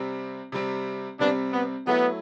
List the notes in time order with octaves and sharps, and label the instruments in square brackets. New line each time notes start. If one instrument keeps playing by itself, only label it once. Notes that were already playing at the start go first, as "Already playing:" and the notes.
Already playing: [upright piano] C3 G3 C4
C3 G3 C4
[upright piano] C3 G3 C4 [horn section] B3 D4
[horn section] B3
[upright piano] F#3 A3 E4 [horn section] B3